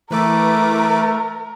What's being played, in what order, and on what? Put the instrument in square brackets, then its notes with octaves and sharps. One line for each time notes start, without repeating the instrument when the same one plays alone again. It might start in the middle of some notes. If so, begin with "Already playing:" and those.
[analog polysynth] E3 B4 D6 [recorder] A3 [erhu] A#4